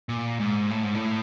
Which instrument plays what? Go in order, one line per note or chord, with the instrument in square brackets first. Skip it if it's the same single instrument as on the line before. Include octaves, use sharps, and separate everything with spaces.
[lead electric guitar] A#2
G#2
A2
G#2
A2